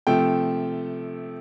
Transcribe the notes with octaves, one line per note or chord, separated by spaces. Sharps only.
C3 F3 A3 G5